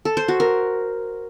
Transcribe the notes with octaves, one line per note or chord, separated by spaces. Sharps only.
A4
C5
F#4
A#4